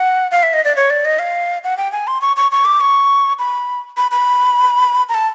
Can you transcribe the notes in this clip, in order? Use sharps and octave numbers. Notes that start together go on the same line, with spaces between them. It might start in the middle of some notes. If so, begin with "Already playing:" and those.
Already playing: F#5
F5
E5
D#5
D5
C#5
D5
D#5
F5
F#5
G5
G#5
C6
C#6
C#6
C#6
D6
C#6
B5
B5
B5
A#5
A5